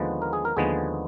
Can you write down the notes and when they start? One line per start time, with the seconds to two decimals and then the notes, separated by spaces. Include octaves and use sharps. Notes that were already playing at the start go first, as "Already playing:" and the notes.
Already playing: D#2 D3 F3 G#3 B3
0.22 A#4
0.33 G#4
0.45 A#4
0.57 D#2 D3 F3 G#3 B3 G#4